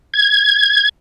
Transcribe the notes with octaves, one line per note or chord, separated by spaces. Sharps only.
G#6